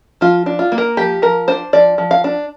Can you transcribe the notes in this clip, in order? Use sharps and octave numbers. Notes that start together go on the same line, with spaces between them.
F3 F4
D4
F4
A#3
A#4
F3 G4
F3 A#4
D4 C5
F3 D5
F3
F5
D4